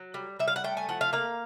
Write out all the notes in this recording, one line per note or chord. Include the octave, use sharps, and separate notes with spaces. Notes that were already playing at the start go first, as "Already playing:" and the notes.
Already playing: F#3
G3
G3 E5
F5
F#5
A3 G5
G#5
F3 F#5
F5
A#3 F5